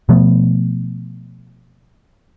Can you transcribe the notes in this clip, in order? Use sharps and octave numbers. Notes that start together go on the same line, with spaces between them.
B2 F3 A3 B3